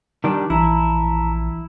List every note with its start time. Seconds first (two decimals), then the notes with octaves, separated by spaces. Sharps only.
0.24 D#3 G3 D4
0.50 A#1 E3 E4 A5 A#5